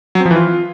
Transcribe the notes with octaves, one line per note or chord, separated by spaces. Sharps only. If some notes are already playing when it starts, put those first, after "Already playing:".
F#3
C4
F3
E3
F4